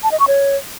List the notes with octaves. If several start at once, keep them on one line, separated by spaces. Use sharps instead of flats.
A5
D#5
C#6
C#5